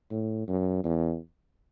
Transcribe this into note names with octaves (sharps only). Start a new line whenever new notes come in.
A2
F#2
E2